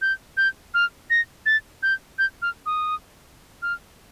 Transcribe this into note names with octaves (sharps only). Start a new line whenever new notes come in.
G6
G6
F6
A#6
A6
G6
G6
F6
D#6
F6